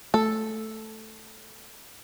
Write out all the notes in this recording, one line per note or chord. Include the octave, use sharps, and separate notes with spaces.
A3 A4